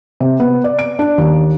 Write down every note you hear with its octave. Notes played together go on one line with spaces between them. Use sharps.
C3
B3
D5
D7
D4
D#2